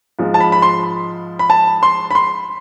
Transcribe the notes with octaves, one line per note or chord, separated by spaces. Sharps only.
G#2 F3 G#3
A5
B5
B5
C6
B5
A5
C6
B5
C6